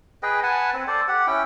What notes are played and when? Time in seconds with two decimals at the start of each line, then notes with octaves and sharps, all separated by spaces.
0.23 G#4 B4 D#5 G5
0.43 B4 F#5 G#5 A5
0.73 C4
0.87 A4 C5 D5
1.08 G4 F#5
1.27 C#4 E4 G5